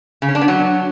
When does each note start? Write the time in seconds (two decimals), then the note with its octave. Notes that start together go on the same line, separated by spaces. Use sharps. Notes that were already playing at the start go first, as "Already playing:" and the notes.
0.22 C#3
0.28 C#4
0.35 D4
0.41 B3
0.48 F#3